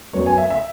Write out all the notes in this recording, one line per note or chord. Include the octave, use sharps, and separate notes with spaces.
F#2 F#3 B3 C#5
G#5
E5
E5